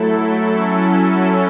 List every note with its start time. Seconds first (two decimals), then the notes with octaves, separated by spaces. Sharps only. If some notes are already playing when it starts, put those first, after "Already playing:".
Already playing: F#3 A3 E4 A4
0.51 F#3 C#4 E4 A4